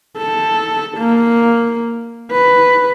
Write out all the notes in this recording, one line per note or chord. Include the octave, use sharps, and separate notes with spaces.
A4
A#3
B4